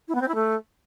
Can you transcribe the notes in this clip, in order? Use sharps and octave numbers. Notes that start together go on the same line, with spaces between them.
E4
B3
C4
E4
A3